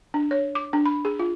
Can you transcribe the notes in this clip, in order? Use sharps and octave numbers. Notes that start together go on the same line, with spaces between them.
D4
C#5
D6
D4
B5
G#4
F4